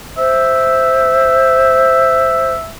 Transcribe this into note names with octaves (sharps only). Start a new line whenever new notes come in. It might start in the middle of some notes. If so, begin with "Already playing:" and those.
C5 E5